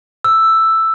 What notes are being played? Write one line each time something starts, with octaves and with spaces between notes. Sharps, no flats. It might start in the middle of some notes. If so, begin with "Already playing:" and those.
E6